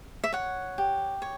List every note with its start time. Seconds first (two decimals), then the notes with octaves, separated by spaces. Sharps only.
0.24 E5
0.33 C#5 F#5
0.78 G4
1.22 C#5